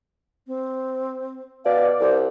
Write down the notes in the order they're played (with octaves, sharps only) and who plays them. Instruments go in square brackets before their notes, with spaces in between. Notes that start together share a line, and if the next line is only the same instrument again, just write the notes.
[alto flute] C4
[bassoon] B2 [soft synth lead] D5 [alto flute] F5
[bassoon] C2 [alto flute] C5